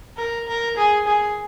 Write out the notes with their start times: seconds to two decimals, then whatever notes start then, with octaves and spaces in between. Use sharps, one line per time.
0.17 A#4
0.47 A#4
0.77 G#4
1.07 G#4